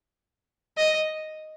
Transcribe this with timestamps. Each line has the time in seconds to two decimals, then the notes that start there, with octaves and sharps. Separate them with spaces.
0.77 D#5